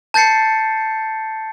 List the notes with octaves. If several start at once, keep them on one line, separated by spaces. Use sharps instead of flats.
A5 G6 A6 C7 C#7